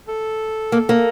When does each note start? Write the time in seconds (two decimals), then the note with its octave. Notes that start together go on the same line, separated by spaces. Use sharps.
0.08 A4
0.72 A#3
0.89 A#3